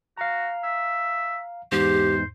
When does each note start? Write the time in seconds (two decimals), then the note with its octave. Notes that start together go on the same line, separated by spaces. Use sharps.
0.18 F#4 F5 A#5
0.64 E5
1.72 E2 G#2 G4 C5